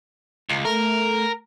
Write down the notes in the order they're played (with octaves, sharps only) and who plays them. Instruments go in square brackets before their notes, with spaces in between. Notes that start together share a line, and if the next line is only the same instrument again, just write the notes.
[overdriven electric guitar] C#2
[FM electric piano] A3 [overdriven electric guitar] A#4